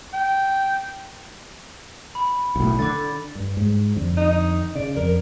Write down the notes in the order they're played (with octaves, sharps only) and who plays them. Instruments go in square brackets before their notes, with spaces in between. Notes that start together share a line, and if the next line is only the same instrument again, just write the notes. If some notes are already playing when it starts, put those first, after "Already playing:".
[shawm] G5
[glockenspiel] B5
[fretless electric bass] B1 A2
[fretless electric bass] D3 [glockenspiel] D6 A6
[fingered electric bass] G2
G#2
F2 D3
[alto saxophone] D#4
[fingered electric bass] C#3 [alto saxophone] D5
[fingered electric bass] F2 [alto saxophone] A#4